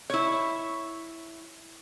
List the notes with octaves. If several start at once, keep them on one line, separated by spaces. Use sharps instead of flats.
E4 C#5